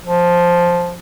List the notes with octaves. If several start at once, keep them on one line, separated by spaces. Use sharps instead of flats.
F3